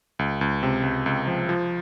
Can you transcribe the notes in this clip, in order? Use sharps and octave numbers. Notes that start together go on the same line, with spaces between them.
C#2
C#2
C3
C#2
C#2
F3
F3